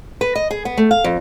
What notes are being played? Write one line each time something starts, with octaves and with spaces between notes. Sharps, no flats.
B4
D#5
G#4
B3
A3
F5
F2